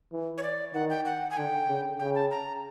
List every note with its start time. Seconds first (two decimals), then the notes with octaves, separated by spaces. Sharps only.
0.12 E3
0.38 C#5
0.43 D5
0.74 D#3 F#5
0.90 G5
1.05 F#5
1.30 G#5
1.37 D3 G5
1.68 C#3
1.99 C#3 G5
2.15 A5
2.31 A#5